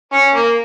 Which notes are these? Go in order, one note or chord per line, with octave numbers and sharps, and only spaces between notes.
C#4
A#3